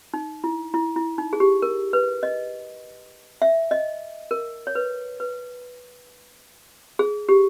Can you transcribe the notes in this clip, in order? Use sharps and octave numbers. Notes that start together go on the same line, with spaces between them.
D#4
E4
E4
E4
D#4
G#4
G4
A#4
B4
D#5
E5
D#5
A#4
C#5
B4
B4
G#4
G4